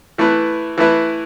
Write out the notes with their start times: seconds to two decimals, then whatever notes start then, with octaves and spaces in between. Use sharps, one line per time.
0.18 E3 A3 E4 B4
0.78 E3 A3 E4 B4